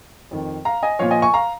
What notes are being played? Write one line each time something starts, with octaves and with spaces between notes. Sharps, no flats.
F2 D#3
F5 A#5
D#5 G#5
A#2 F3 C#5 F5
D#5 G#5
G#5 C#6
F5 A#5